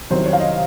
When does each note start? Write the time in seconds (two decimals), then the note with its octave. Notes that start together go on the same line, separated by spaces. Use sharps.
0.10 C2 C3 D#3 F#3 C5
0.25 C#5
0.33 F5
0.40 D#5